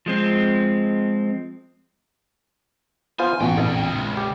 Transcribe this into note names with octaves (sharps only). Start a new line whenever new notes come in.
F3 G#3 C4
B3 F4 C5 G#5
A1 B2 D3 G5
A#1 F2
C#2
G4